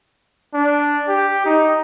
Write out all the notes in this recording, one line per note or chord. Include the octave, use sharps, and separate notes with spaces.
D4
G4
D#4